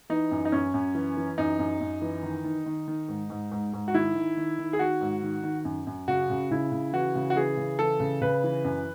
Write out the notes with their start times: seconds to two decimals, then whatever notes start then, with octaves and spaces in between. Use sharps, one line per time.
0.10 E3 D#4
0.31 F#2
0.45 D#4
0.52 F#2 C#4
0.74 F#2
0.95 E3
1.17 E3
1.38 F#2 D#4
1.59 F#2
1.81 F#2
2.02 E3
2.23 D#3
2.44 D#3
2.66 D#3
2.88 D#3
3.08 G#2
3.30 G#2
3.51 G#2
3.73 G#2
3.88 F#4
3.94 D#3 E4
4.15 D#3
4.37 D#3
4.59 D#3
4.73 G#4
4.79 D#3 F#4
5.01 G#2
5.23 D#3
5.44 D#3
5.65 F#2
5.87 F#2
6.08 C#3 F#4
6.30 C#3
6.51 C#3 E4
6.72 C#3
6.93 E3 F#4
7.15 C#3
7.30 F#4
7.36 E3 G#4
7.57 C#3
7.79 E3 A4
8.00 C#3
8.21 C#3 B4
8.44 E3
8.64 F#2